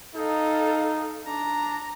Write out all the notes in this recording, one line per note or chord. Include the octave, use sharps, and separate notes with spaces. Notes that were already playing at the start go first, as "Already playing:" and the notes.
D#4 A4 F5
D4 A#5